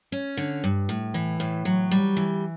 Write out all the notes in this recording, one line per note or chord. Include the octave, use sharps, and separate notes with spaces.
C#4
D3
G2
A2
E3
A2
F#3
G3
E3